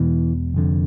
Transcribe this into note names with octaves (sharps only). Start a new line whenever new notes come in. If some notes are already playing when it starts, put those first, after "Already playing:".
Already playing: E1 E2 B2 E3
F1 F2 D3